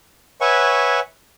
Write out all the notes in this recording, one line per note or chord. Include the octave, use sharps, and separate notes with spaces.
B4 C#5 E5 F#5 G#5 C#6